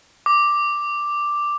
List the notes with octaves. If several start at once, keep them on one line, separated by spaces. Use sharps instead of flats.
D6